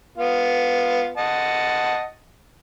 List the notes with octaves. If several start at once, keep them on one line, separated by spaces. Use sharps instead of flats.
B3 F4
D#5 F#5 A5